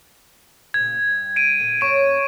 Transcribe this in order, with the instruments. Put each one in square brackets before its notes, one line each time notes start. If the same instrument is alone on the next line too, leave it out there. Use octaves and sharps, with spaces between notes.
[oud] A#2 C#3 [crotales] G#6
[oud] G2 G3
[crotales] D7 D#7
[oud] A#2 D3
[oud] F#2 A#3 C#4 [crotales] C#6 D7